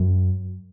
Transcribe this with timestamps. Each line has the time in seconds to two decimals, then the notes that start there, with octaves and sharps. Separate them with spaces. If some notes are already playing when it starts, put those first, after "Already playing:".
Already playing: F#2